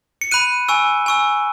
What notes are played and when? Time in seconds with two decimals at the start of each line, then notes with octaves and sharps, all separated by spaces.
0.21 C#7
0.31 B5 F#6 D#7
0.69 G#5 C#6 E6
1.06 G#5 C#6 E6